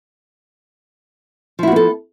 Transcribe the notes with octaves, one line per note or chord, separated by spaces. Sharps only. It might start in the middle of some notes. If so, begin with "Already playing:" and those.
F3 B3 E4 F#4 A4